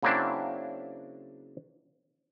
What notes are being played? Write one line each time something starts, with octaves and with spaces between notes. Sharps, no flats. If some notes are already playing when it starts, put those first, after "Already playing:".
C#3 F#3 A#3 C4 D4 E4